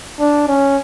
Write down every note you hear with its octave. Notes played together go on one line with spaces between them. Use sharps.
D4
C#4